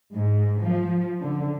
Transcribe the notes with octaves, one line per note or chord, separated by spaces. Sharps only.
G#2
F3
D3